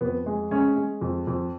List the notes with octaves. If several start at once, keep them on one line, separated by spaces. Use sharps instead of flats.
F2 B3
G#3
G#3 C#4
G#3
F2
F2